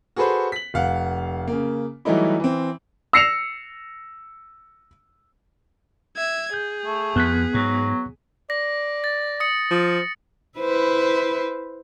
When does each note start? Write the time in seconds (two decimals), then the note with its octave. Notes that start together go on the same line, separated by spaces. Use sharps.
0.16 F#4 G#4 A4 B4 C5 B5
0.52 B6 F#7
0.74 F1 F5 F#5
1.47 C#3 A#3
2.05 E3 F#3 G3 A3 D#4 E4
2.40 E3 C4
3.13 E6 A#6 C7 C#7 E7 F7
6.16 E5 G#6
6.54 G#4 G6
6.86 A3
7.16 F2 B3 F#6 B6
7.54 G#2 F#3
8.50 D5 A#6
9.04 A6
9.40 D#6 C#7
9.71 F3
10.58 E4 B4 C5